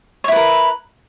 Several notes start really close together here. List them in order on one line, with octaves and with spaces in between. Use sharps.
C#5 E4 B4 A#4